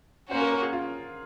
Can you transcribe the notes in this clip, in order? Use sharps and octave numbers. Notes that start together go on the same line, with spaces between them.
A#3 C#4 F#4 C5
A#4
A#4
G#4
F4